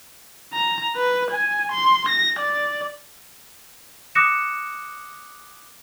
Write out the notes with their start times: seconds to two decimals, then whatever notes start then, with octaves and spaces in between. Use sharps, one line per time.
0.53 A#5
0.96 B4
1.31 G#5
1.72 C6
2.09 A#6
2.39 D5
4.15 D6 D#6 F#6 A#6 C#7 E7